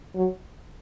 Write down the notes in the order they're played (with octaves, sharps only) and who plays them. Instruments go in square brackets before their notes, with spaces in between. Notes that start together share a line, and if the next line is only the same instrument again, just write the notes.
[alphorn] F#3